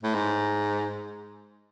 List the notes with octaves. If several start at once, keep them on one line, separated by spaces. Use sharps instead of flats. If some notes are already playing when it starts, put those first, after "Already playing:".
A2
G#2